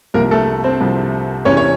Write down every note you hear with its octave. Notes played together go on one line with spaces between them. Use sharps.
C2 C3 F3 A#3 A#4
A3 A4
C4 C5
C2 C3 F3
E2 C3 E3 C#4 C#5
C#5